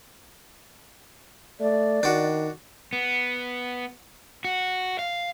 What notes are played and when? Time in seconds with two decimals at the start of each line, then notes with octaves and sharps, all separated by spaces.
1.60 A3 D5
2.03 D#3 D4 F#4
2.93 B3
4.45 F#4
4.99 F5